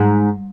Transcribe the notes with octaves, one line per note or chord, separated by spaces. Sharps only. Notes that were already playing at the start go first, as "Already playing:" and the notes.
Already playing: G#2